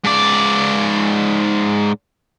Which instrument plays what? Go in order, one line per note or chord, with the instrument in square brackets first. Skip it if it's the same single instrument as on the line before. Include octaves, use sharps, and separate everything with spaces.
[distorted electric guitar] G#2 D5